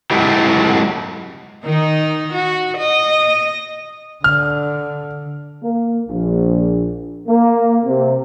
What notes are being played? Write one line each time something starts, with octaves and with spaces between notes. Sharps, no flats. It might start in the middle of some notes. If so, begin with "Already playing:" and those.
F#3 G#3 A3 E4 G4
D#3 D#4
F#4
D#5
D3 F6
A#3
A#1
A#3
C3